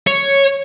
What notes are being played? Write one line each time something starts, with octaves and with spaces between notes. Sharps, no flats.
C#5